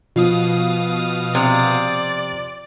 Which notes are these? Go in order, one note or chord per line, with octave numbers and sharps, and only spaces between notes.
B2 F3 F5 D#6
C3 D5